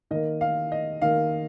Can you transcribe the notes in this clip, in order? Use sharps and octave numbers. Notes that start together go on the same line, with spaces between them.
D#3 A#3 D#5
F5
D#5
D#3 A#3 F5